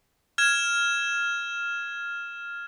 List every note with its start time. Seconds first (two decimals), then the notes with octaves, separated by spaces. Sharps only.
0.38 F6 G#6 E7